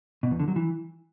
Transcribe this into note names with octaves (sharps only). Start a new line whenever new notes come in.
B2
E2
D3
F#3
E3